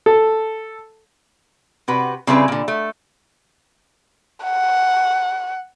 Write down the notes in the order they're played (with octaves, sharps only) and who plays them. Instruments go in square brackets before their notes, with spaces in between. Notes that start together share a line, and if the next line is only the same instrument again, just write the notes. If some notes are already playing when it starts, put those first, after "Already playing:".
[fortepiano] A4
[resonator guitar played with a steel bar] C3 F#4 B4
C#3 G3 C4 E4 G#4 B4
A#2 D3
A3
[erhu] F#5